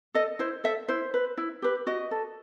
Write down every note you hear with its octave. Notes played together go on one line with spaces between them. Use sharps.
A4 D#5
E4 C5
A4 E5
E4 C5
B4
E4
G4 B4
F#4 D#5
A4